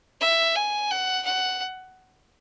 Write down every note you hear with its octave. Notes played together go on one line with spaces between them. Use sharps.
E5
G#5
F#5
F#5